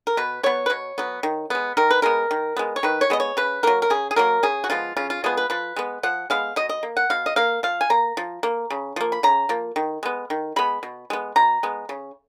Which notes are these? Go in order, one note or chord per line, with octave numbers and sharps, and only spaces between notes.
A#4
B2 B4
F#3 B3 C#5
B4
B2 C#5
F#3 B3
D#3
G#3 B3
D#3 A#4
B4
G#3 B3 A#4
D#3
G#3 B3
C#5
D#3 B4
C#5
G#3 B3 D#5
C#5
C#3 B4
F#3 A#3 A#4
A#4
C#3 G#4
G#4
F#3 A#3 A#4
C#3 G#4
F#4
F3 G#3 B3 F4
C#3 F4
F4
F3 G#3 B3 G#4
B4
F3 B4
G#3 B3
F3 F#5
G#3 B3 F5
B2 D#5
D#5
A#3
F#5
B2 F5
D#5
A#3 F5
F3 F5
G#5
A#3 A#5
F3
A#3
C#3
F3 A#3
B5
C#3 A#5
F3 A#3
D#3
G#3 B3
D#3
G#3 B3 B5
B2
G#3 B3
B2 A#5
G#3 B3
C#3